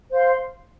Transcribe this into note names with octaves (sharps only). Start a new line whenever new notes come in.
C5 F5 C6